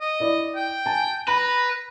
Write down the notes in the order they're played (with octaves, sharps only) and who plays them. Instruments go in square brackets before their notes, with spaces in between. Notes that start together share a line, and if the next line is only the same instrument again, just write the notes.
[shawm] D#5
[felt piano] E4 D5
[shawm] G5
[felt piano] G#5 A5
[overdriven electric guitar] B4 [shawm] A#5 [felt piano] B5